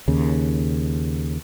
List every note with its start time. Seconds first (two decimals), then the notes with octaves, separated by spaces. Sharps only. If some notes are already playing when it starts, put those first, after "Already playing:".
0.08 D#2 C#3